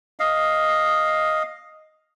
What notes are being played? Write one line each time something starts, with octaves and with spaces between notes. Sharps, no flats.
D#5 F5